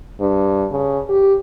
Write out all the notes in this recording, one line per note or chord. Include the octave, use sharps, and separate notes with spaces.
G2
C#3
G4